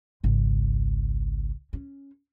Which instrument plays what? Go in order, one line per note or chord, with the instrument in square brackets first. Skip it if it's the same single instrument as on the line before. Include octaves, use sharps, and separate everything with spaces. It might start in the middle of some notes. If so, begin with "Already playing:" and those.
[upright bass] G#1 C#2
C#4